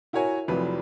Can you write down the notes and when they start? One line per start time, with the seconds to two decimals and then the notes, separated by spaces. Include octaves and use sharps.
0.13 E4 F#4 A#4 C#5 G#5
0.48 F1 F2 F#3 E4 B4